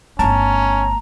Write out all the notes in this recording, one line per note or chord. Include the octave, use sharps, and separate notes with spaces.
G1 A3 C#4 A5 A#5